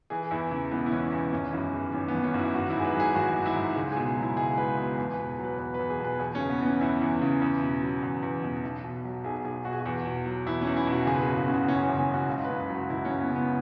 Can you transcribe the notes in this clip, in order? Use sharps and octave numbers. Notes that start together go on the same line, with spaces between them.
E3 G#4
E2 E4
C#3 E4
E1 B3
E4
E3 C#4
E2 B3
G#1 C#4
F#2 E4
E3 G#4
G#1 C#4
B3
G#1
C#4
F#2
E4
G#1 F#4
G#2 E4
G#4
B4
F#3
G#4
G#1 F#4
G#1
E4
G#2
C#2 G#4
B2 G#4
F#3
E4
C#2 G#4
C#2 B4
B2 G#4
E2 G#4
B4
B2
F#3
B4
E2 B4
E2 B4
G#4
B2
B4
E2 G#4
C#3 C#4
B3
E3
C#4
E2 E4
E2
C#3
E2
B2
F#3
E2
E2
B2
B1
B2
F#3
B1 G#4
B1 G#4
B2 F#4
G#4
F#4
E2
B2
F#3
E2 E4
C#4
E2
E4
B2
F#4
F#1 G#4
B4
G#4
F#2
F#4
C#3
F#4
F#1 C#4
C#4
F#1
C#4
F#2
F#4
C#2
C#3 B4
B4
F#3
F#4
C#2 E4
C#4
C#2
B3
C#3 B3